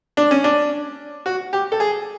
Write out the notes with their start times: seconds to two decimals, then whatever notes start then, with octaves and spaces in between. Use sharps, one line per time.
0.17 D4
0.31 C#4
0.44 D4
1.26 F#4
1.53 G4
1.72 A4
1.80 G#4